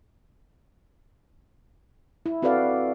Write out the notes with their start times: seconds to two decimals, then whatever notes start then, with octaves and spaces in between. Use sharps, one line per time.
2.26 E4
2.42 C4 F#4 A4 B4 D5 F5